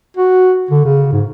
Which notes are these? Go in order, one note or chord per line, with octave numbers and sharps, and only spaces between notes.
F#4
D3
C#3
G#2